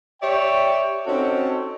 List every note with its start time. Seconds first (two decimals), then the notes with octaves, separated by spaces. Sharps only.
0.22 G4 C#5 D5 E5 G5
1.06 C4 C#4 D#4 F#4 A4